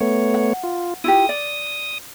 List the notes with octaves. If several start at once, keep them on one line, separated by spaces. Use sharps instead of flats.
A3 B3 C#5
F#5
F4
E4 F4 G4 D#6
D5